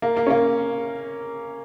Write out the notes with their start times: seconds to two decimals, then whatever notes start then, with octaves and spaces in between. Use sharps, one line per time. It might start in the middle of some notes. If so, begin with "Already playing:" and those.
0.02 A#3
0.17 A#3
0.27 C#4
0.30 A#3